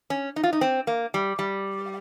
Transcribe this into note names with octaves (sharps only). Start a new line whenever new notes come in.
C#4
D#4
F4
D#4
C4
A#3
G3
G3